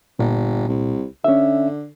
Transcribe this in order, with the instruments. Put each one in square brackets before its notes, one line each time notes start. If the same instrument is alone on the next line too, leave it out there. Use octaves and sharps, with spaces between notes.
[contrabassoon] G1 [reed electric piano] A#2
[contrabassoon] C2
[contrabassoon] D3 [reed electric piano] C#4 E5